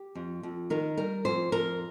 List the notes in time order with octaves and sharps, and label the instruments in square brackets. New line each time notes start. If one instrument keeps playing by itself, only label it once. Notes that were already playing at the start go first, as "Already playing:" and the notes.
Already playing: [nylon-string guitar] G4
F2
F2
D#3 A#4
G3 A#4
F2 C5
F2 A#4